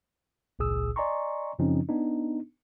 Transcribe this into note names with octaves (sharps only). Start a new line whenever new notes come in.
G#1 C#2 A#2 G#4 D#6 E6
D5 D#5 G#5 A#5 C6 C#6
F#2 C#3 F3 C4 C#4 D#4
B3 D4 D#4